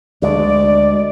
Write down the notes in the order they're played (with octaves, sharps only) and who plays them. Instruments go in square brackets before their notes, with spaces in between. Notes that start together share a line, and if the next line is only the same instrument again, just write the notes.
[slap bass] D2 G#3 [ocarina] D5